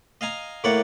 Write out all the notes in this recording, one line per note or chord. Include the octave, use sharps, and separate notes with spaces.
D#5 F5 G#5 A#5
A2 A#3 C#5 D5 F#5